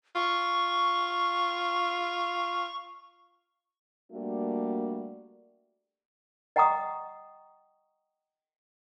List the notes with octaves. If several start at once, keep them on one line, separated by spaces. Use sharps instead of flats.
F4 C#6
G3 A3 A#3 D4 F#4
D#5 F#5 G5 A#5 C#6 D#6